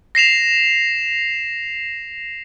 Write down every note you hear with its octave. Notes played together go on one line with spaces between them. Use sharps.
A#6 C7 E7 F7